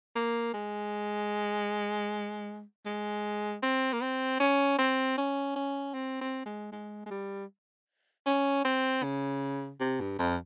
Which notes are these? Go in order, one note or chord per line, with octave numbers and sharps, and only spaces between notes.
A#3
G#3
G#3
C4
A#3
C4
C#4
C4
C#4
C#4
C4
C4
G#3
G#3
G#3
G3
C#4
C4
C#3
C3
G2
F2